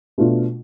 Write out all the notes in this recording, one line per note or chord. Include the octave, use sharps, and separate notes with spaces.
B2 A3 D4 F4